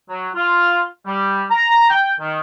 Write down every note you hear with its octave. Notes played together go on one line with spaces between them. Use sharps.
F#3
F4
G3
A#5
G5
D#3